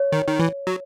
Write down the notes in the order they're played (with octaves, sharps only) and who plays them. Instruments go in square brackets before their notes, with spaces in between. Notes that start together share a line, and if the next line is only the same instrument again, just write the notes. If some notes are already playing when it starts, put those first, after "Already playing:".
Already playing: [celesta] C#5
[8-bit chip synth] D#3
D#3
E3
F#3